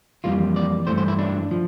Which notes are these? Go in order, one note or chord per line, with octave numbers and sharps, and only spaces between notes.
F2 E3 G3 A#3 F4
D5
G2 E3 A3 C5
C5
E4
D4
F3